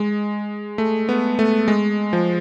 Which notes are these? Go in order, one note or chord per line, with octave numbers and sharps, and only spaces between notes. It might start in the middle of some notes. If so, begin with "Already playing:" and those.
Already playing: G#3
A3
B3
A3
G#3
F3